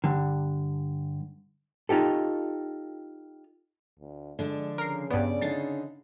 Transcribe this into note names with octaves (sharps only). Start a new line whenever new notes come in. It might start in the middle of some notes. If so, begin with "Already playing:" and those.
G2 D3
D#4 F4 G4 A4
D2
D3 F3 G#3 D4
C#3 A#4 C7
G2 B3 D5
D3 D#4 A6 C7